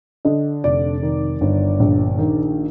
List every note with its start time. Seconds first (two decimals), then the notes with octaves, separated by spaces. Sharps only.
0.25 D3 D#5
0.64 F1 D5
1.03 D#3
1.41 G1
1.80 A#1
2.19 D#3